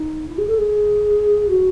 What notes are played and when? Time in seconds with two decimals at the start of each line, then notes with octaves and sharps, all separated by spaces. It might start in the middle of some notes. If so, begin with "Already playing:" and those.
Already playing: D#4
0.27 E4
0.38 G#4
0.47 A4
0.58 G#4
1.48 F#4